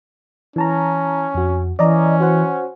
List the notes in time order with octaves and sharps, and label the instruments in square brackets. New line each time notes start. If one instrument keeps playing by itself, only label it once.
[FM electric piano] E3 A5 A#5 [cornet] C#4
[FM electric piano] F2 F#4
[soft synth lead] E3 [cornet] C#4 [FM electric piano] D5 D#5 A#5
[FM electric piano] F#4 C5 F#5